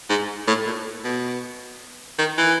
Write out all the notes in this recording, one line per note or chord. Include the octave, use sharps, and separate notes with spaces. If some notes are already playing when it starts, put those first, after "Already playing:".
G#2
A2
A#2
B2
D#3
E3